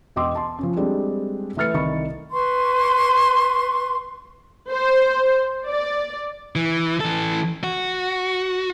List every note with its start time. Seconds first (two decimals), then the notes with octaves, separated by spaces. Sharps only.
0.16 E1 D#5 G5 C6 D6 E6
0.35 A5 C6
0.59 F3 C#4
0.76 G3 G#3 C4 D4 G4 A4
1.57 E3 A3 B4 F6 A6 C#7
1.74 C2 D#3 B5 C#6
2.32 B4 C6 C#6
4.70 C5
5.68 D5
6.56 E3
7.00 E3 A4
7.64 F#4